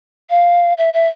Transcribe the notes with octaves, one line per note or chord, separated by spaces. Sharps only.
F5
E5
E5